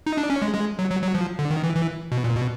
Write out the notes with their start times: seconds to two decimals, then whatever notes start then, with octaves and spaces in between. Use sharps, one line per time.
0.06 D#4
0.17 D4
0.30 C#4
0.42 G#3
0.54 G#3
0.79 F#3
0.90 F#3
1.02 F#3
1.15 F3
1.39 D3
1.50 D#3
1.64 E3
1.76 E3
2.12 B2
2.24 A#2
2.36 B2